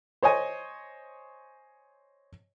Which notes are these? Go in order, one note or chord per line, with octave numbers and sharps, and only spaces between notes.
C5 C#5 D#5 G#5